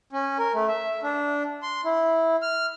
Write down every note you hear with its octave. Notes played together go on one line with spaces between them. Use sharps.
C#4
A#4
A3
E5
D4
C6
E4
F6